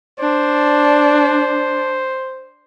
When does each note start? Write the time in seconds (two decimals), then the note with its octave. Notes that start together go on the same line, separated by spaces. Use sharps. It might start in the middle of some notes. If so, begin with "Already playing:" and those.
0.20 D4 C5